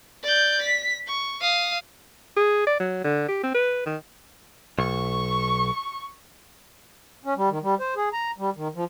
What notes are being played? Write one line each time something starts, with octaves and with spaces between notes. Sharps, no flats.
D5 G6
B6
C#6
F5 D#6
G#4
D5
F#3
D3
G4
C4
B4
D#3
B1 C#6
C#4
G3
D#3
G3
C5
G#4
A#5
G3
D#3
F3